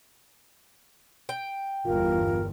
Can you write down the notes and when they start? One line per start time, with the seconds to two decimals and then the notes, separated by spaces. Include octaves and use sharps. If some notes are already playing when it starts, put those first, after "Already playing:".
1.29 G5
1.86 G1 E2 F4 A#4